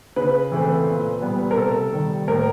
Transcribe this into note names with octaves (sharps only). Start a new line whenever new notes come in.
C#3 B4
E3 A3 C4
A#2
G3 B3
A#4
C3 A4
D#3 G3
A2 A#4